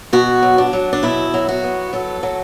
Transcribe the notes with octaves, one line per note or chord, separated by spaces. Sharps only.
B2 F#4
F#3
D4
F#3
D4
B2 E4
F#3
F#4
B3
F#3 A4
F#3